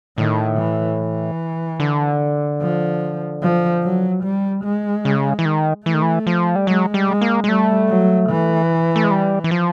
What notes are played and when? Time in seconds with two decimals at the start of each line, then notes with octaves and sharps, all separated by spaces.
0.18 A2 D#3
0.58 E3
0.99 E3
1.80 D3
2.62 F3
3.42 F3
3.83 F#3
4.23 G3
4.64 G#3
5.05 C#3
5.39 E3
5.45 D#3
5.86 E3 A3
5.94 D#3
6.02 E3
6.27 F3
6.55 G3
6.67 F#3 G#3
6.94 G3
7.08 G#3
7.21 A#3
7.44 G#3
7.48 G3 A3
7.89 F#3
8.29 E3
8.96 A3
9.04 G#3
9.11 G3
9.44 E3
9.51 F3